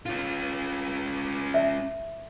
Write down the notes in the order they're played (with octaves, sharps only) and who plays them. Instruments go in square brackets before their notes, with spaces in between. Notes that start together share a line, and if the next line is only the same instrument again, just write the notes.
[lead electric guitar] C#4 F4
[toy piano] E5